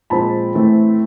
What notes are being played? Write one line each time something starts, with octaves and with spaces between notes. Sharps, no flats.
A#2 F3 G#3 C4 A5 B5
A2 E3 A3 C4